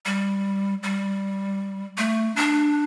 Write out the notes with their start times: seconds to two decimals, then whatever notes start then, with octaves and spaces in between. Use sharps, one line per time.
0.06 G3
0.83 G3
1.98 A3
2.36 D4